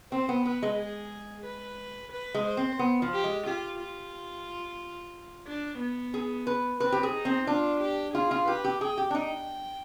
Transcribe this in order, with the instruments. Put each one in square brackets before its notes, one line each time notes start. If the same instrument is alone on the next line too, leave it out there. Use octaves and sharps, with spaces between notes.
[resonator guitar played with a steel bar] C4 [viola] C5
[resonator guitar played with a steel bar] B3
[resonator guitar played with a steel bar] B3 [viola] B4
[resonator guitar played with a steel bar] G#3
[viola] G#4
B4
B4
[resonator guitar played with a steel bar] G#3
[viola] C5
[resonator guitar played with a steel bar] C4
B3
F3
[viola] G4
[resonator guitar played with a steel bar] G#3
[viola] F4 [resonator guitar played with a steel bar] G4
[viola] F4
D4
B3
[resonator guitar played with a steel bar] G#4
B4
[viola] C4 [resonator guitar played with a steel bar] B4
[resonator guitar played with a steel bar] G4
G#4
[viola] D#4
[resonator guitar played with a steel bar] C4
[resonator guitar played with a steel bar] D4 [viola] F4
[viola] G4
[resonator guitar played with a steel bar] F4 [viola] G#4
[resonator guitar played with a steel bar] F4
[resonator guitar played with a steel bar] G4 [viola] B4
[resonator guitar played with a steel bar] G4
[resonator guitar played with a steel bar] G#4 [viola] G5
[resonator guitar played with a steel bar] G4
D4
[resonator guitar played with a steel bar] D#4 [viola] G5